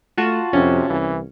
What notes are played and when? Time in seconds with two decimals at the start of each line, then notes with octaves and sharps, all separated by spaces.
0.18 A3 F4 F#4 A5
0.53 F2 C3 C#4
0.89 C2 E3